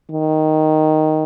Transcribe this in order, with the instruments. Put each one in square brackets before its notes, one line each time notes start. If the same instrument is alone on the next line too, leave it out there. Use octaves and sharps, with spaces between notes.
[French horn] D#3